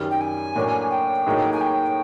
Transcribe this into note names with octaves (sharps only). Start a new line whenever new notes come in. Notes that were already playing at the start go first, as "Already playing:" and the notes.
Already playing: F#2 D#3 G3
G5
G#5
A2 F#3 A#3 D4
G5
A2 F#3 A#3 D#4 G#4
G#5
G5